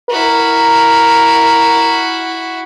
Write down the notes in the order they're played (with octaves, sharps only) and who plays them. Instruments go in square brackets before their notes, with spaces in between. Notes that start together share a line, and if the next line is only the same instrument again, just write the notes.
[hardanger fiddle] E4 F#4 [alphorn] A#4